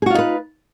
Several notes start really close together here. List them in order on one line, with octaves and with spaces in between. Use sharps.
G#4 F#4 F4 D#4 B4